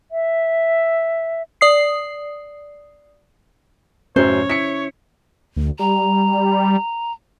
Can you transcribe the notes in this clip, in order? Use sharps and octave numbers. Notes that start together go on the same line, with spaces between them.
E5
D5 D#6 C7
A1 F#2 F#3 C#4 C5 C#5
E4 B6 C#7
D2
G3 A#5